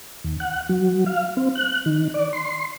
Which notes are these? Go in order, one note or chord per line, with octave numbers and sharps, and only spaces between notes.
D#2
F#5
F#3
F5
C4
F#6
D#3
D5
C6